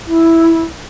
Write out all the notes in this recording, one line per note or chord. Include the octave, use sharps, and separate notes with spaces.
E4